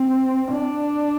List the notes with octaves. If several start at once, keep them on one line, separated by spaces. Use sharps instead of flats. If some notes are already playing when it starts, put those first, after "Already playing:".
Already playing: C4
D4